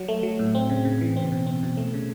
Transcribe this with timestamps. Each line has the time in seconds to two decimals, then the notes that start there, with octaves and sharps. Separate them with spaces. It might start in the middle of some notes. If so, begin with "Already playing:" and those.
Already playing: F#3
0.08 A3
0.23 F#3
0.39 A2
0.55 C4
0.69 C#3
0.85 C#3
1.01 E3
1.16 C4
1.32 B2
1.47 C4
1.63 B2
1.77 A3
1.94 C#3